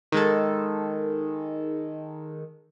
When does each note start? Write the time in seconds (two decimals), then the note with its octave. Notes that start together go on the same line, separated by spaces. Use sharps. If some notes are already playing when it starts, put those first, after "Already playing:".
0.12 D#3 G#3 A4